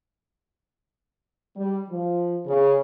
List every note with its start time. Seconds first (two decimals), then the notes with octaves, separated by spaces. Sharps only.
1.57 G3
1.90 F3
2.46 C#3